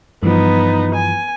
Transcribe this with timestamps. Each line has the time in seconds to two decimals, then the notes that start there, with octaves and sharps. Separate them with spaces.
0.23 G2 E3 F3 B3 D#4
0.95 G#5